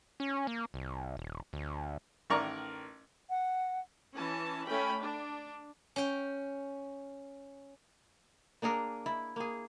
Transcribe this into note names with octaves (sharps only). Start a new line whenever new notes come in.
C#4
A#3
C2
D#1
D2
A1 D#3 A#4 D5 A#5 C#6
F#5
E3 C#4 A5
A3 C#4 G5 B5
D4
C#4 G5
A#3 D4 G#4 A#4
E4
A#3 G#4